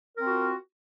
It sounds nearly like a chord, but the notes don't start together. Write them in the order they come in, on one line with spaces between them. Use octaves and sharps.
A#4 C4 F#4 F4